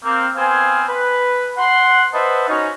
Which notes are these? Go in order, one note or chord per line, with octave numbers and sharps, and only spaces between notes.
A#3 C4
B3 C4 C5 F5 G#5
B4
F#5 C6
B4 C5 D#5 E5 F#5 A5
C#4 D#4 F#4